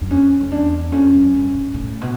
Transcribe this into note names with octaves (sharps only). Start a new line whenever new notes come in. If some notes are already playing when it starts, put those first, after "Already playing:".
F#2
F2 C#4
F2
E2 D4
F2 C#4
F#2
G2
G#2
A2
B2